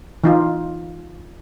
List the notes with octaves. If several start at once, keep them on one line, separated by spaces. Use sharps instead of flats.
E3 D#4 F4